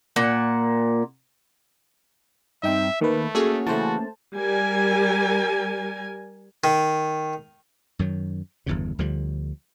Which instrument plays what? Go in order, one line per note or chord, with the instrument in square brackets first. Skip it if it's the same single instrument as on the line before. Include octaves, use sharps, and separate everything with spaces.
[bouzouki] A#2 A#3 F#5
[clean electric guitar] G2 C4 [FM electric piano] D#4 G5 [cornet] E5
[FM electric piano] D#3 B4 [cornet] A3 [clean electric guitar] A#3
[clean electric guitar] A#3 C#4 [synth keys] F#4 G#4 C#5 [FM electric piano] A4
[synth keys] C#3 E3 [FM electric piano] A3 C5 A5 [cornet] F#4
[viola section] G3 A#4 G#5
[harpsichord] D#3
[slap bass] F#2 D#3 F#3
G1 E2 G2 C#3
D2 D3 F3 G3